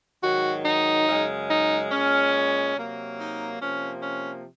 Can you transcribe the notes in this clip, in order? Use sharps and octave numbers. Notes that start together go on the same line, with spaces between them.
G#2 D#3 F#3 F#4
D#4
F#2 C#3 G#3
D#4
A#2 G#3 C#4
C3 F#3 A#3
D#4
C3 F3 A#3 C#4
C#4